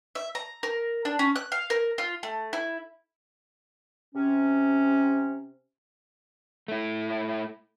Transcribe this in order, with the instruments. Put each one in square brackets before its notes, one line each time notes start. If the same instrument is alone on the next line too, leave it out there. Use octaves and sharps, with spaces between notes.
[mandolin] E5
A#5
A#4
D4
C#4
F#6
F5
A#4
F4
A3
E4
[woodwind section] C3 C#4
[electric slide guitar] A3 E4